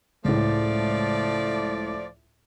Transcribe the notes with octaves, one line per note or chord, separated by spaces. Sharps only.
C#2 A2 F3 A3 D5